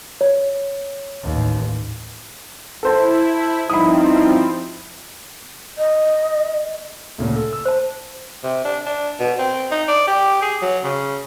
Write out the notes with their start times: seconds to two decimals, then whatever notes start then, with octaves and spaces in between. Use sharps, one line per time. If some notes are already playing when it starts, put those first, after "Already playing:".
0.21 C#5
1.23 A1 D#2
2.83 E4 A4 C5 A5
3.70 G2 F3 C4 D#4 E4 B5 D#6
5.78 D#5
7.18 D2 A#2 C#3
7.36 A4
7.53 E6
7.65 C5 A5
8.44 C3
8.65 D4
8.86 D4
9.20 B2
9.39 C4
9.71 D#4
9.89 D5
10.08 G4
10.42 G#4
10.62 F#3
10.84 C#3